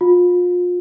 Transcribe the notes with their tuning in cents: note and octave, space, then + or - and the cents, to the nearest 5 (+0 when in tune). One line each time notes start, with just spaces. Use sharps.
F4 +30